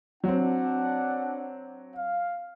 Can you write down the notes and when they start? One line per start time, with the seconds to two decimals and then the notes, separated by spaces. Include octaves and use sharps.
0.24 F#3 C4 D4 F#5
1.95 F5